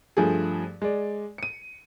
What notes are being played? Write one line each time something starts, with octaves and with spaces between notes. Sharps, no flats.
G2 F3 A3 G#4
G#3 D5
C#7 D#7